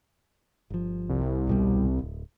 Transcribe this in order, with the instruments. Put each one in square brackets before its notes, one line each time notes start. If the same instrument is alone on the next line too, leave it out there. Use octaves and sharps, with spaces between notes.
[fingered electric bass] G1 F3
[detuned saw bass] C2
[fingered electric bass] G#1 B2 G3
D1